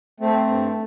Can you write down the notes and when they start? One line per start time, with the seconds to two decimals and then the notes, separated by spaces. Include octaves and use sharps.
0.20 A3 C4
0.47 G2